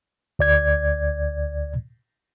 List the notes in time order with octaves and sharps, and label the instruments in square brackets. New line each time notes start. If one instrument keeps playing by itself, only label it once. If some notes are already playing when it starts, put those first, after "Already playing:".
[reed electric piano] D2 D5 G#6